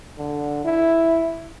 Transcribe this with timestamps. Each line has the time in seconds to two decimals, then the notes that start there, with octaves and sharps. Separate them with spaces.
0.18 D3
0.65 E4